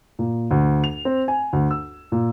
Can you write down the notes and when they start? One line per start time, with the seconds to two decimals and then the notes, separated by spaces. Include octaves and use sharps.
0.19 A#2
0.51 D2
0.84 F7
1.05 C4
1.28 G#5
1.53 D2
1.71 E6
2.12 A#2